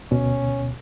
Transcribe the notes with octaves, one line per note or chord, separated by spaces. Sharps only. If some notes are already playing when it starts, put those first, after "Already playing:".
D2 B2 C#4